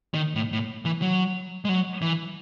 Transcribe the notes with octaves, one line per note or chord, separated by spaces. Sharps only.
D#3
A2
A2
E3
F#3
G#3
F#3
E3